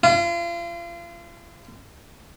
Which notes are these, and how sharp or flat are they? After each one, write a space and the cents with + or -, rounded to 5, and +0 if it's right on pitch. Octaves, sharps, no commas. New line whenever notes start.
F4 -35